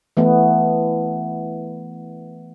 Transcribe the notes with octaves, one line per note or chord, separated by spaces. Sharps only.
E3 A3 B3